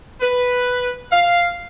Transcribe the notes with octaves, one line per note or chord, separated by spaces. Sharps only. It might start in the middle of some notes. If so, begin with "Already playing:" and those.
B4
F5